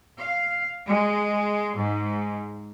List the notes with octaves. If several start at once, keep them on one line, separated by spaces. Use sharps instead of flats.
F5
G#3
G#2